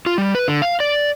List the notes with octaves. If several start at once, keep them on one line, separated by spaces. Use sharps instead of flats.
F4
G3
B4
D3
F5
D5